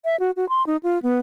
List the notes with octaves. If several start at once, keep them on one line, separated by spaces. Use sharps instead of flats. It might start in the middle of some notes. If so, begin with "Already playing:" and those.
E5
F#4
F#4
C6
D#4
F4
B3